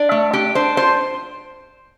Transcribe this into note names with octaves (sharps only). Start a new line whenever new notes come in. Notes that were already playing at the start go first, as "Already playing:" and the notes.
Already playing: D4 D5
A3
D4 G4
D4 C5
F4 C5